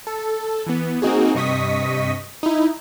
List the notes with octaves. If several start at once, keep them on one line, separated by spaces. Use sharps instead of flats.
A4
E3 B3
A#3 C4 D#4 F#4 G#4
G2 C3 D#5 C#6 D#6 B6
D#4 E4